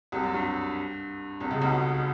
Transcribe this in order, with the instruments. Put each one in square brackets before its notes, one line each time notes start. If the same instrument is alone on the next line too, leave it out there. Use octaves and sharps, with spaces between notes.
[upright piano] C2 C3
F#2
G2
C2 C3
C#2 C#3
B1 B2